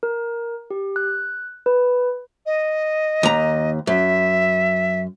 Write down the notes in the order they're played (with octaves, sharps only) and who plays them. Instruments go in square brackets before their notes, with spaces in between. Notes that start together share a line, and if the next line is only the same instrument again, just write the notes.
[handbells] A#4
G4
F#6
B4
[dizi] D#5
[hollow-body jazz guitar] D#2 A#5
[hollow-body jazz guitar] F#2 [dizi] E5